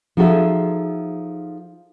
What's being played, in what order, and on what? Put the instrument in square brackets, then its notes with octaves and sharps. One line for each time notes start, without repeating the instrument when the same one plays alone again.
[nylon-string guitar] F3 D#4 F#4 G#4 A4 E5